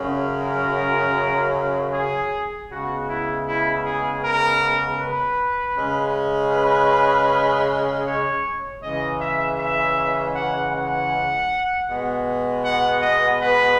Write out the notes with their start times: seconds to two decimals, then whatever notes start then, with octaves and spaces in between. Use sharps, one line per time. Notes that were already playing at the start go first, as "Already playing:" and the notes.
Already playing: F#2 C#3 F#3 C#4
0.41 A#4
1.93 G#4
2.71 C#3 G#3 B3 F#4
3.09 E4
3.46 E4
3.85 G#4
4.23 A#4
5.00 B4
5.76 C#3 G#3 C#4
6.52 B4
8.05 C#5
8.82 C#3 E3 G#3 C#4 D#5
9.20 E5
9.59 E5
10.35 F#5
10.73 F#5
11.87 B2 G#3 B3
12.64 F#5
13.02 D#5
13.40 B4